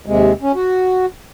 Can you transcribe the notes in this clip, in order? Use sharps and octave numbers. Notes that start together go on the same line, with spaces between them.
D#2 C3 G#3
C#4
F#4